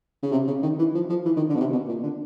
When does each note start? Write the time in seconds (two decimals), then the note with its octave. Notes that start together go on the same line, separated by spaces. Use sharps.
0.23 C#3
0.32 C3
0.47 C#3
0.63 D#3
0.79 E3
0.95 F3
1.10 F3
1.25 E3
1.37 D#3
1.49 D3
1.56 B2
1.60 C3
1.72 B2
1.88 A#2
2.03 D3